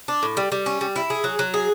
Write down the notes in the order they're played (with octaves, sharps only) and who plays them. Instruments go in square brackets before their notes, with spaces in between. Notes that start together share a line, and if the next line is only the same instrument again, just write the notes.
[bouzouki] D4
A2
G3
G3
C#4
G3
E4
G#4
F#3
F#3
G#4